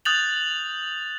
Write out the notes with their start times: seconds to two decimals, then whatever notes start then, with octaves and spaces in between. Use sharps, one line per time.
0.05 D#6 F#6 G6 A6 F7 F#7